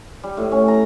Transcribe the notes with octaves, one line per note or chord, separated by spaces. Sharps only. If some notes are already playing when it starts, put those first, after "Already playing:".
G3
A2
C#4
A#5